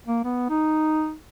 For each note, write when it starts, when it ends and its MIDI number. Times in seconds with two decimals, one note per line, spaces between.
0.07 0.20 58
0.24 0.45 59
0.50 1.13 63